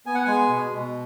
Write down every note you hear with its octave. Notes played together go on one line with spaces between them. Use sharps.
B3 G#5
F#5
G#3 G#5
B2
B2